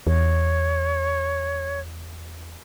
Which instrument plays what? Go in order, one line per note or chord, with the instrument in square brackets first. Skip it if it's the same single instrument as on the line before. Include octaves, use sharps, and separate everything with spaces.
[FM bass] E2 [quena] C#5